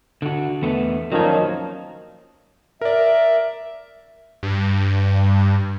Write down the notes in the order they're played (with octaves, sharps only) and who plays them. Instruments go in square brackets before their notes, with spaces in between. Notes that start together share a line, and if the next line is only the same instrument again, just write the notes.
[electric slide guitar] D3 F#4
E2 A3 B3
[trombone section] A#2 D#3 F3 [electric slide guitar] F#3 C#4 C#5
[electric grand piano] A#4 D5 [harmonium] E5
[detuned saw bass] G2